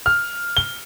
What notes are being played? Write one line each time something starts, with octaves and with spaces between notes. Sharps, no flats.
F6
G7